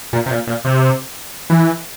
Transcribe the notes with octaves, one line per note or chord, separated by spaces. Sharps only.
A#2
C3
A#2
A#2
C3
E3